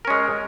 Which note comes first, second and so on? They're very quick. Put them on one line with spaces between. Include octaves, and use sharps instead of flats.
A#4 C#4 G#3